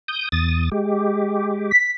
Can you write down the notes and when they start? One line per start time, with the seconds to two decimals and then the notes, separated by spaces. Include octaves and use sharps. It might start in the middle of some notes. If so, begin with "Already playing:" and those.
0.08 D#6 G6
0.32 E2 D#6 A6
0.72 G#3 G4
1.71 B6